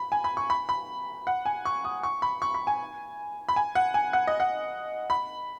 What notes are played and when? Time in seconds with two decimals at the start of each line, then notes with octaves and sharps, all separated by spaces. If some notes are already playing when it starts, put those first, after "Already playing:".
Already playing: B5
0.12 G#5
0.24 B5
0.37 C#6
0.50 B5
0.69 B5
1.27 F#5
1.45 G#5
1.65 C#6
1.85 D#6
2.03 C#6
2.22 B5
2.42 C#6
2.54 B5
2.67 G#5
3.49 B5
3.56 G#5
3.75 F#5
3.94 G#5
4.13 F#5
4.27 D#5
4.40 F#5
5.10 B5